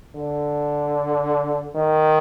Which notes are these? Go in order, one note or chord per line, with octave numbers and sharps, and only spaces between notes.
D3
D#3